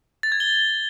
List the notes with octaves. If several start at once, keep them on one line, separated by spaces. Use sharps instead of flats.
A6
G#6
G7